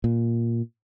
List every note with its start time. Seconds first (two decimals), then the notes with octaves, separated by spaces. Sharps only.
0.04 A#2